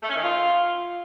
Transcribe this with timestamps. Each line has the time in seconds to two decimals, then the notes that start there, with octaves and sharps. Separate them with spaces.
0.03 A3
0.10 C#4
0.16 D#3
0.23 F4